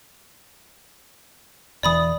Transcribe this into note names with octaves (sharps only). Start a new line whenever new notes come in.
E1 E3 D5 B5 D#6